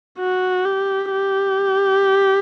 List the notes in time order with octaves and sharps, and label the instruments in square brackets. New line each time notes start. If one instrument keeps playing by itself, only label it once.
[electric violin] F#4
G4
G4